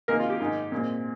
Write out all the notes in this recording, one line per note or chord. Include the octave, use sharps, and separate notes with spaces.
C3 D#3 G#3 A#3 D#4 A#4
F4
G4
G#2 D#3 G#3 D#4
A#2 G#3 C4